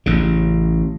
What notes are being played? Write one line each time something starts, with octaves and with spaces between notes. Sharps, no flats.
A1 C#3